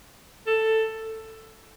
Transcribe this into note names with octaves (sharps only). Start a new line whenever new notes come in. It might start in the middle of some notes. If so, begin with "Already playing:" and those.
A4